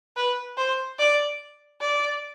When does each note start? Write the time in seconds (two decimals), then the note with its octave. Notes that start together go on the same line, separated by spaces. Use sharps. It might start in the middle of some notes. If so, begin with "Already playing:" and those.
0.16 B4
0.58 C5
0.99 D5
1.81 D5